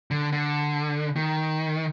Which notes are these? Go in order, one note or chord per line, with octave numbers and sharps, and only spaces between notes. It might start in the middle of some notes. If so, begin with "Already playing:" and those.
D3
D3
D#3